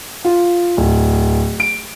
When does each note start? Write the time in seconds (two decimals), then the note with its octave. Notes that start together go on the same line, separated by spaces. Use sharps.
0.25 F4
0.77 D1
1.60 D7